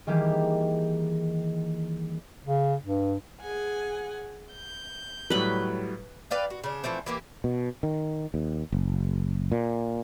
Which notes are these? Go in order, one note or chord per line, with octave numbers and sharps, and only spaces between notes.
D#3 E3 G3 A#3 G4 G#4
C#3
G2
G#4 F#5 G#5
G6
A2 F#3 G3 B4 B5
B4 D5 F5 G5
F#4
C#3 D4
E3 F3 A3 C4
E3 A#3 G4
B2
D#3
D#2
F#1
A#2